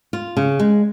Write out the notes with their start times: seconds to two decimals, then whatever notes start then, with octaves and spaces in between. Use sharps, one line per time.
0.13 F4
0.37 C#3
0.59 G#3